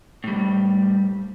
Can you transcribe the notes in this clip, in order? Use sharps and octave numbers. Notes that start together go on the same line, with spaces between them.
A2 G3